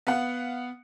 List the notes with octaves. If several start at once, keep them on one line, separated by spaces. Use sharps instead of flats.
B3 F5 F#5